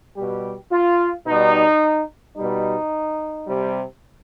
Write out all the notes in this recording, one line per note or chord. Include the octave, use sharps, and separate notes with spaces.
B2 G3 G4
F4
B2 G3 D#4
B2 G3 D#4
C3 G3